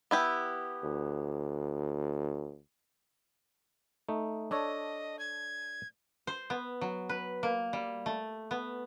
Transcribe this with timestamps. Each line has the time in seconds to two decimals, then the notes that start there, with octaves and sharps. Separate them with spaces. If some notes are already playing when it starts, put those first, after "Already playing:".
0.11 B3 E4 G4
0.83 D2
4.09 A3 D#4
4.51 D4 A4 C#5 D#5
5.19 G#6
6.27 C5
6.50 B3
6.81 F#3
7.09 B4
7.43 A#3
7.73 G3
8.06 A3
8.51 B3